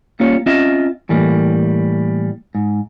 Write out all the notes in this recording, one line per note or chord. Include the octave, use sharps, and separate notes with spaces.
G3 A#3 C#4 F4 C#5
C4 C#4 F4 D#5 E5
A2 E3 G3 A#3
G#2